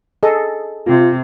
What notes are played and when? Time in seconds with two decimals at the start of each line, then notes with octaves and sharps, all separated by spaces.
0.23 G#4 A4 D#5
0.87 C3 F4